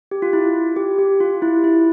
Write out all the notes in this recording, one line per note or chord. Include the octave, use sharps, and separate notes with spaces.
G4
F4
E4
G4
G4
F4
E4
E4